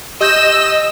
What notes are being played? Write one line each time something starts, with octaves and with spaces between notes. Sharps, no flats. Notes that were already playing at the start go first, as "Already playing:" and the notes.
G4 D#5 E6 G6 E7